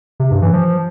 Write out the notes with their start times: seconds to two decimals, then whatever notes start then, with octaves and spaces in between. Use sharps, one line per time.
0.20 C3
0.31 G2
0.42 E3
0.53 F3